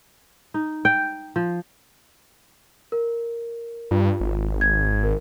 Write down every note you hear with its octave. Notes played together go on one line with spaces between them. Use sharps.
D#4
G5
F3
A#4
G2 F4
G#1
G#6
A#4